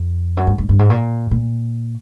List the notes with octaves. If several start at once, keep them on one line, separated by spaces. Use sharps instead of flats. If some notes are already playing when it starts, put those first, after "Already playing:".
Already playing: F2
F#2
G2
G2
G2
G#2
A#2
A#2